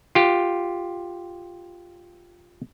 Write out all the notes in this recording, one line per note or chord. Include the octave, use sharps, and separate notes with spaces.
F4 G4